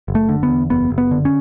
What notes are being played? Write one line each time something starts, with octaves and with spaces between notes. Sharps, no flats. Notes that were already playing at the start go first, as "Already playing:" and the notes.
F#1
A3
D3
B3
E2
F#1 B3
F#1
B3
D3
C#4